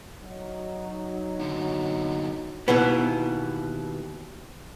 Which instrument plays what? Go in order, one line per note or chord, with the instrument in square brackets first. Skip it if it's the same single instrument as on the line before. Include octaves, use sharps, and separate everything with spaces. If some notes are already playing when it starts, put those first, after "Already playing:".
[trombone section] F#3 D#4
[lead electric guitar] F#2 D3
[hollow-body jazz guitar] D#2 B2 E3 B3